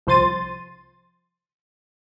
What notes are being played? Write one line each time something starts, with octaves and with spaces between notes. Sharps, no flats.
C2 F3 C5 C6 A6 D#7